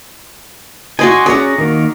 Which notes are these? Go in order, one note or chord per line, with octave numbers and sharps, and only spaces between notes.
F#4 D5 D#5 G#5 C6
C#4 F#4 G#4 D5 A#5
D#3 A#3